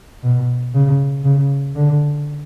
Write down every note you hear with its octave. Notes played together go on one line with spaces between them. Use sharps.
B2
C#3
C#3
D3